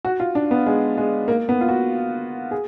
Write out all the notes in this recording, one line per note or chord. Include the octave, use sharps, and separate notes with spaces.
F#4
F4
D4
B3
G#3
G#3
A#3
B3
F4
F#4
G#4